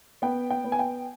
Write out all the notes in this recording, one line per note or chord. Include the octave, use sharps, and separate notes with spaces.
B3 G5
G5
B3
G#5
G5